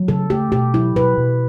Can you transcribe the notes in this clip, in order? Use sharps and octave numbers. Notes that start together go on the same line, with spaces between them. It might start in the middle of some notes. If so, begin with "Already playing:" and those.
Already playing: F#3
C#3 A4
A3 G4
B2 G4
F#3 E4
B2 B4
B2